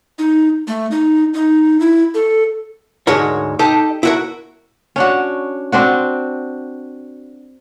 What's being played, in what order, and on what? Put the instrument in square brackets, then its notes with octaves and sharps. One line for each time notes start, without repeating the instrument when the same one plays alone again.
[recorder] D#4
A3
D#4
D#4
E4
A4
[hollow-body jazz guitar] D2 G#2 G#3 F#4 A#4 C#5
D#4 G4 A4 D#5
E4 F#4 A#4
[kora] C#4 D4 F#4
C4 D4 F#4